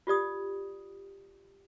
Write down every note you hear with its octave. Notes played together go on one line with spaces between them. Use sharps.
F4 G4 D5 D#6